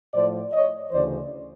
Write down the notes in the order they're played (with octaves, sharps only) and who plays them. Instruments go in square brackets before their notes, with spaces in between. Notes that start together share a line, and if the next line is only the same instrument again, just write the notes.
[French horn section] A2 F3 C5 D5
C#5 D#5
D2 C#3 E3 C5 D5